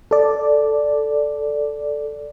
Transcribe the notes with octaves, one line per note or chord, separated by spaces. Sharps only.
A4 D5